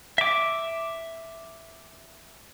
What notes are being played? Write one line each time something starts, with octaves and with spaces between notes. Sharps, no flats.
E5 D6